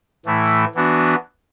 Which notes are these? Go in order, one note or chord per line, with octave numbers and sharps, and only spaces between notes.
A2 E3 A3 E4
E3 B3 D4 F#4